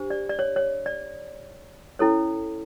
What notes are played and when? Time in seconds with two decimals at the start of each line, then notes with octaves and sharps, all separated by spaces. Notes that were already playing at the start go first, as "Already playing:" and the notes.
Already playing: D4 G4 C5
0.10 D5
0.29 D5
0.39 C#5
0.56 C#5
0.86 D5
1.99 C#4 E4 A4 C#5